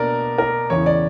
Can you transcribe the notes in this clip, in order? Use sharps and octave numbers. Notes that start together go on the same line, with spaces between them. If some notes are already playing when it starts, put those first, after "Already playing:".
Already playing: B2 A#3 D4 A#4 D5
A#4
E2 C#3 E3 C#5
D5